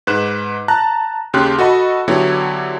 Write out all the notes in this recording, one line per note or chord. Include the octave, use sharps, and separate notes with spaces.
G#2 B4 F#6 E7
A5 A#5 F#6
D#2 C#3 G4 C6 F#6
F#4 A4 D#5 B5
D3 F#3 B3 E4 G4 C#5